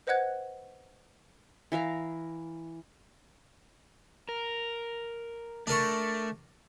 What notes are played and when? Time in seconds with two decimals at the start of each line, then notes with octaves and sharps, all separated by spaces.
0.07 B4 C5 D#5 F#5 F#6 G#6
1.72 E3 E5 F5 A#5
4.29 A#4
5.67 A3 D4 A#4 C#6